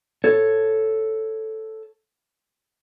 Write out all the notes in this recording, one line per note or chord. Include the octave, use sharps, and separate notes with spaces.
A4 C#5